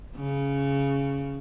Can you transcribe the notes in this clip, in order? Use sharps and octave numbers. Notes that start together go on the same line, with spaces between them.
C#3